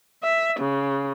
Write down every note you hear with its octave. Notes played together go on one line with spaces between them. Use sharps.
E5
C#3